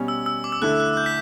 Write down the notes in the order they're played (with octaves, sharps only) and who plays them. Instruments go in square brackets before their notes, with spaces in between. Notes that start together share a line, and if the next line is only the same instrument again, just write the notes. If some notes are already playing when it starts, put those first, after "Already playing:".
Already playing: [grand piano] B2 G3 C#4
[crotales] E6
E6
D6
E6
[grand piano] D2 D3 A3 E4 A4 [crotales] F#6
[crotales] F#6
G6
B6